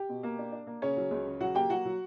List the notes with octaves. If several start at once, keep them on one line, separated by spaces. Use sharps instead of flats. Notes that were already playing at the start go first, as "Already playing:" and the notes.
Already playing: G4
B2
A#3
D4
D4
A#3
C#3 C#4 C#5
F#3
C#2
C#3
F#3 F#4 F#5
A#3 G4 G5
F#3 F#4 F#5
F#3